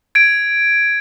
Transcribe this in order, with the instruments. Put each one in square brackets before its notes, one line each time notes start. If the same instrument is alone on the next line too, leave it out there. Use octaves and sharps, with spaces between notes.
[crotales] G#6 D7